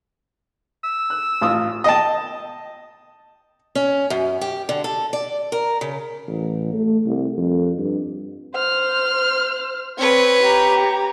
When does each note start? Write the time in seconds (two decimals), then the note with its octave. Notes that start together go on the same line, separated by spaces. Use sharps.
0.84 E6
1.10 F#6
1.41 A1 F4 D#6
1.84 D#5 G5 A5
3.75 C#4
4.10 F#2
4.41 G4
4.69 D3
4.84 A4
5.13 D5
5.52 A#4
5.81 C#3
6.28 A1
6.73 A3
7.06 C2
7.38 F2
7.78 G2
8.54 C5 F6
9.98 C4 B4 C#5
10.43 G4 A#5